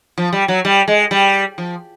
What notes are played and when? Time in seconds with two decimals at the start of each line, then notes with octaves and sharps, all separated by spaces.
0.18 F3
0.33 G3
0.48 F#3
0.65 G3
0.88 G#3
1.11 G3
1.58 F3